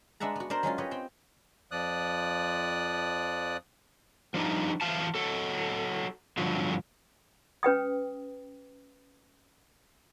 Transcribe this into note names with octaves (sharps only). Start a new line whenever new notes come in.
G#3 D4 B4 E5 F#5 A#5
B3 F#4
D4 A#4 C5 A#5
F#3 G#3 C#4 F4
G4 B4 C#5 D#5
C4 G5
F2 F3 D5 D#6 F#6
F3 G3 D4 D#4
E3 A3 F5 A5
F#3 A4
G2 D3 F3 F#3
C#4 B4 G5 D#6